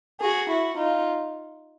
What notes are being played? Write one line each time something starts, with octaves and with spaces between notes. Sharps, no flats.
F#4 G#4
E4 F#4
D#4 F4